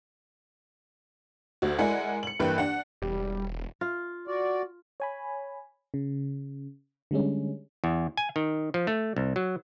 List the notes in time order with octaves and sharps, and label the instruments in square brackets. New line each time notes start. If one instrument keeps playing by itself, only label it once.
[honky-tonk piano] D2 F#4
G#3 E4 A#4 D5 F#5 G#5
C#7 F#7
G2 E3 A#3 B4 G5 F#6
D4 F#5
[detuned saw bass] E1 [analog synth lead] G3
[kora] F4
[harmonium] F#4 D5
[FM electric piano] C#5 G#5 B5
C#3
D3 G3 G#3 C#4
[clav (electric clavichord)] E2
G#5
D#3
F3
A3
C2
F#3